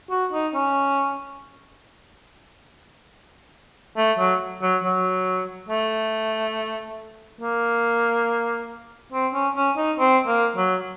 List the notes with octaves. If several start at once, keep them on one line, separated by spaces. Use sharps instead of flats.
F#4
D#4
C#4
A3
F#3
F#3
F#3
A3
A#3
C4
C#4
C#4
D#4
C4
A#3
F#3